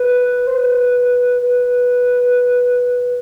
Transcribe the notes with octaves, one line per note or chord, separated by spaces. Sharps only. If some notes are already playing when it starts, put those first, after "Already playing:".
Already playing: B4
C5
B4
B4